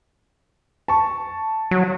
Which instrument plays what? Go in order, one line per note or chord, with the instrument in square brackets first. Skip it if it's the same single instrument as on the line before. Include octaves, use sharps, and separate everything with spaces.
[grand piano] A5 C#6
[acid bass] F#3